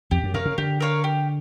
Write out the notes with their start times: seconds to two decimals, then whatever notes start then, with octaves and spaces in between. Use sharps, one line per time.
0.11 F2 G4
0.23 F#2
0.34 C3 A#4 C#5 F5
0.46 C#3
0.58 D3 G4
0.80 A#4 C#5 F5
1.04 G4